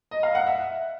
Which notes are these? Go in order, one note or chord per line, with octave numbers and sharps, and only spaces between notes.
D#5
F5
F#5
E5